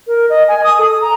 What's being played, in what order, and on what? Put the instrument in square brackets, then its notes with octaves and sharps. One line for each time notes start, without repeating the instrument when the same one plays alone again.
[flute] A#4
D#5
G#5
D#6
A4
A#5